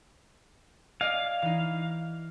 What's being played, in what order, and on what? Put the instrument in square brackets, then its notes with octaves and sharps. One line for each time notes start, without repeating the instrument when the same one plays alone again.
[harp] D5 D#5 G#5 [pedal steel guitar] F5
[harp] E3 D#4